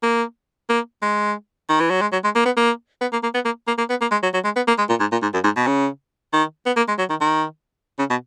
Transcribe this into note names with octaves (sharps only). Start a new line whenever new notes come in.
A#3
A#3
G#3
D#3
E3
F#3
G#3
F#3
G#3
A#3
B3
A#3
B3
A#3
A#3
B3
A#3
A#3
A#3
B3
A#3
G#3
F#3
F#3
G#3
B3
A#3
G#3
A#2
G#2
A#2
G#2
F#2
G#2
B2
C#3
D#3
B3
A#3
G#3
F#3
D#3
D#3
C#3
B2